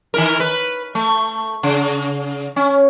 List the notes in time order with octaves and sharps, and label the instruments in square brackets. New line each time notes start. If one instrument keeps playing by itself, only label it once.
[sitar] D#3 E4 A#4
B4
A3
C#3
C#4